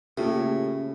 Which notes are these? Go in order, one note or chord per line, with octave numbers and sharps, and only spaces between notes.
A2 C#3 A#3 F4 G4